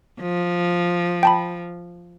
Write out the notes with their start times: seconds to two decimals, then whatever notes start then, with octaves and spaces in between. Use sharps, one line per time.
0.21 F3
1.23 G5 A5 B5